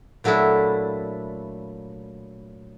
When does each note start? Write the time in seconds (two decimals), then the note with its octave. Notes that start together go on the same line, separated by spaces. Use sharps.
0.24 A#2 F#3 A3 D4 E4